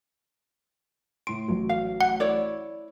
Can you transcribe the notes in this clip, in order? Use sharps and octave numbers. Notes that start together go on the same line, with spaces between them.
A2 C6 D7
A1 F#3
F5
F#5
E4 C#5 D5